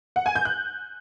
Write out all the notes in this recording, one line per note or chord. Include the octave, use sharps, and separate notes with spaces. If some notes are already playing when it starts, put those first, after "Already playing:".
F#5
G#5
G6
F#6